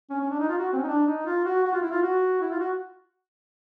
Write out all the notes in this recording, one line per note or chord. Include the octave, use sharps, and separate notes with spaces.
C#4
C#4
D4
D#4
F4
F#4
C4
C#4
D#4
D4
D#4
F4
F#4
F#4
F4
E4
F4
F#4
E4
F4
F#4